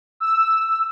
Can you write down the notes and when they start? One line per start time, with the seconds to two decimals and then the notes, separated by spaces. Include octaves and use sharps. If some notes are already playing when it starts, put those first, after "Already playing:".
0.20 E6